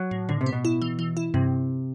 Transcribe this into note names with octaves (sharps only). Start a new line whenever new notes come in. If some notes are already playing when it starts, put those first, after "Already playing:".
Already playing: F#3
A2
A2 D3
C3
B3
B2
E4
E3
E3
E4
G2 C3